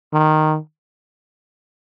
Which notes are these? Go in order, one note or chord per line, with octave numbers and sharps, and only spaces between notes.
D#3